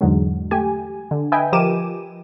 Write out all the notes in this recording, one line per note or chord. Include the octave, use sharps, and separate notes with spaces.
E2 G#2 D3 F#3 G#3
A3 G4 G#5
D3
B4 D#5 E5 G5 G#5
F3 G4 A#4 D6 D#7 E7